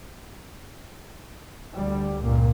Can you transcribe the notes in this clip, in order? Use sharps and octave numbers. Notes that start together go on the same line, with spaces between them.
D2 D3 G3
C#2 G2 A#2 A#3